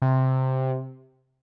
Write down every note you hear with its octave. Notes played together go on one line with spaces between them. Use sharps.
C3